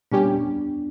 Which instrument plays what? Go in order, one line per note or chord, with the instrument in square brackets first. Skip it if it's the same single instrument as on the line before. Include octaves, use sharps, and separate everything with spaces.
[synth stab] A#2 G3 C#4 G4 [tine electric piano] B3 D4